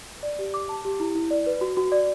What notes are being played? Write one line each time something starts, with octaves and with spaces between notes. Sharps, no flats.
D5
G4
D6
A5
G4
E4
E4
D5
B4
F#4
F#4
D5